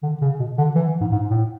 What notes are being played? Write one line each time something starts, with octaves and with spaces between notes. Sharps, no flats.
D3
C#3
B2
D3
E3
G#2
G#2
A2